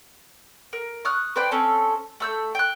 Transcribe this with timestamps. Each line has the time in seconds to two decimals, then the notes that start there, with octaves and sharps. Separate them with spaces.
0.73 A#4
1.05 C#6 D#6 F6 F#6
1.36 B4 C5 D5 G5
1.51 C4 C#4 A4
2.20 A3 E6 G6
2.55 G5 F#6